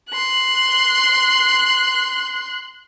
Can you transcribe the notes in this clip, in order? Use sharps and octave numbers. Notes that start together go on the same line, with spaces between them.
C6 F#6